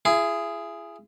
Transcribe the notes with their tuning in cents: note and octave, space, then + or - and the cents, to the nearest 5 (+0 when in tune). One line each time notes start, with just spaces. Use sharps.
E4 +40 G#4 +0